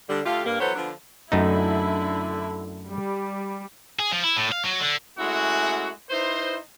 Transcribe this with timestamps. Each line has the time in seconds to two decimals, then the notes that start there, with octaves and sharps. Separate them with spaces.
0.08 D3 G3
0.25 D3 A3 F4 G4 F5
0.45 G2 A#3
0.60 E3 F#3 B3 A4 C5 C#5
0.75 D3 F3 B3 D4
1.32 F#2 D3 A3 D#4 E4
2.90 G3
3.99 G#4
4.11 F3
4.24 E4
4.37 A2
4.52 F5
4.64 F#3
4.80 D3
5.18 G#3 A3 C#4 E4 F#4
6.10 D#4 E4 B4 C5